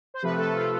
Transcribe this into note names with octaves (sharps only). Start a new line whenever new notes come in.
C5
C3 F3 A3 B4
A4
F4